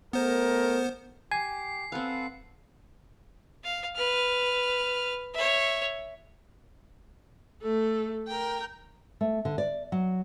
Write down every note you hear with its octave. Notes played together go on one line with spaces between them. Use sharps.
A3 B3 A#4 C5
G4 G#5 C7
C4 A4 B4 F5 F#5
F5
B4 F6
C#5 E5
A3 A4
A#4 G5
A3
D3
D5
F#3